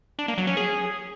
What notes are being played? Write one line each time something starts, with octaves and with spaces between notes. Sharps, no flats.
D4
A#3
F#3
C#4
G#4